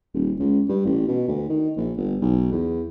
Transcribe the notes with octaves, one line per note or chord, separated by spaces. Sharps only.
D#1
C#2
G2
A1
B2
D2
D#3
A#1
G1
B1
E2